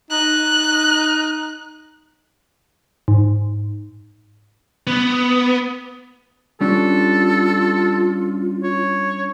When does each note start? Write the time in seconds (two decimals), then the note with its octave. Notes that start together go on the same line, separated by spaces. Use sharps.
0.11 D#4 F#6
3.08 G#2
4.87 B3
6.61 G3 C#4 D4 F4 A4
8.63 C#5